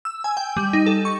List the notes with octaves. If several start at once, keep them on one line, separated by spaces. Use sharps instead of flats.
E6
G#5
G5
G3
D#4
A4
C#6